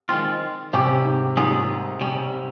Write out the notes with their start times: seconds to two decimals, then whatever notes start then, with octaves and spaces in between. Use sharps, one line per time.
0.09 D#3 G#3 C4 F4
0.73 C3 G3 C#4 G4
1.05 G#2
1.37 G#2 G3 A#3 C#4 F4 G#4
2.01 C3 G3 C#4